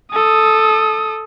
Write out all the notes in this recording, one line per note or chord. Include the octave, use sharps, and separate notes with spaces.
A4 D#6